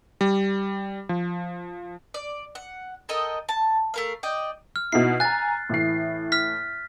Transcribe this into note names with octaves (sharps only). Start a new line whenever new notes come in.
G3
F3
D5
F#5
A4 A#4 D#5 G5
A5
A3 A#4 F5
D5 D#5 G5
F6
B2 D#4 E4 C7
G#5 A#5 F#6 A6
A2 E3 C7
F6 B6